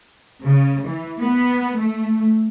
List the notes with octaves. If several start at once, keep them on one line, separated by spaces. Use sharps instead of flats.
C#3
E3
B3
A3